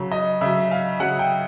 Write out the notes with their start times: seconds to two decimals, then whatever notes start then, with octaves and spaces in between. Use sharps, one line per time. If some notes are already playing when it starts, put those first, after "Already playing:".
Already playing: C#3 F#3
0.12 D#5
0.41 C#3 F#3 E5
0.71 F5
1.00 C#3 F#3 F#5
1.19 G5